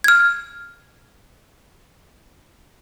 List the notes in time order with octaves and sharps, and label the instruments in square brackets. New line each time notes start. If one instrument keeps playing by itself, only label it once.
[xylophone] F6 G#6